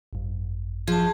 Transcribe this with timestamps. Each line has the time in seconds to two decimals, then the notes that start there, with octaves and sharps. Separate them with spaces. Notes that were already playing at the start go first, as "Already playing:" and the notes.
0.13 G#1 F#2
0.88 F3 G#4 A5